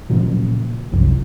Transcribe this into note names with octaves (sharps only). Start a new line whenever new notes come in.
A#2 C#3 F3 F#3
G1 C2 F#2 F3